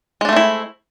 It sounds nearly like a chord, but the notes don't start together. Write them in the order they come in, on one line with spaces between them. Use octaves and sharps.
G#3 D4 A3 C4 E4